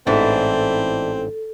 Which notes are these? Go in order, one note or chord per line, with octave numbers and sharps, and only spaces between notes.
A1 G#2 E3 C4 D4 E4 A4